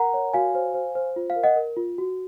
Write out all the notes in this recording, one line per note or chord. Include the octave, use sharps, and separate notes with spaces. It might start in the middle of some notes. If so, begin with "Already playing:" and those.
Already playing: A#4 F#5 A#5
C#5
F#4 F5 G#5
C5
C5
C5
F4
F5
A#4
D#5 F#5
A#4
F4
F#4